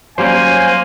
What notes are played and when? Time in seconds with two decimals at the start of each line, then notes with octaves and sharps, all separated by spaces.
0.18 F#3 G3 A#3 C#4 C5 G#5